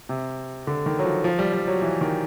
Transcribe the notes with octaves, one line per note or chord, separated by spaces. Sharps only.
C3
D3
D#3
F#3
F3
F3
G3
G3
F#3
E3
D#3